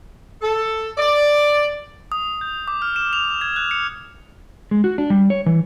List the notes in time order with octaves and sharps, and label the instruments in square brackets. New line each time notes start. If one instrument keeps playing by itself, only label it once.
[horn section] A4
D5
[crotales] D#6
G6
D6
F6
E7
F7
G#6
F#6
C#7
[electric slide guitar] G#3
F#4
D4
G3
C#5
E3